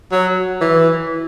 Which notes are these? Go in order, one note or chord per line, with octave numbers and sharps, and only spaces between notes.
F#3
E3